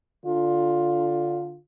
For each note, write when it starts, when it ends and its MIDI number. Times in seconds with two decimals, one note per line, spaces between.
0.24 1.56 50
0.24 1.56 65